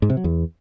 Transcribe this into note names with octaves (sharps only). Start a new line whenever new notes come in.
G#2
C3
F#3
E2